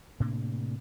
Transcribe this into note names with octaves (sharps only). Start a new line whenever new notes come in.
A2 C3 A#3 D4